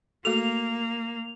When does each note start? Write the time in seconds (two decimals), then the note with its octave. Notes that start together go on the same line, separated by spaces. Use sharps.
0.25 A3 A#3 F#4 A4 F7